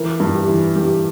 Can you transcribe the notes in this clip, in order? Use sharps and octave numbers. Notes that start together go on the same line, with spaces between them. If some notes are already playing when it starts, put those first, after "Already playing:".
Already playing: E3 A#4
G2
G4
E3
G2 G4